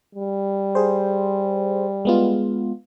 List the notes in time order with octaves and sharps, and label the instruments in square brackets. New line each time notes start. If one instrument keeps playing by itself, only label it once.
[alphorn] G3
[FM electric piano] G#4 C5
G#3 B3 F4